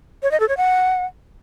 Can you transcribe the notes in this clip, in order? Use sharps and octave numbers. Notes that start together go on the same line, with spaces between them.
C#5
D#5
A4
C#5
F#5